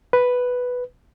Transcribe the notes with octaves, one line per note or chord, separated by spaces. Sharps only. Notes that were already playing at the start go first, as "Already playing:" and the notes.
B4